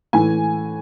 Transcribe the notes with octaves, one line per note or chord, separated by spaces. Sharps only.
A2 E3 G#5